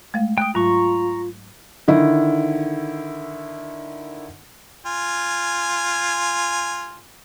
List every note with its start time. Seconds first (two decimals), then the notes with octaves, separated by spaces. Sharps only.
0.14 G#3 A3 F5
0.38 G5 D#6 F#6
0.55 G#2 F#3 F4 A#5 C#6
1.88 D3 D#3 E4
4.86 F4 G#5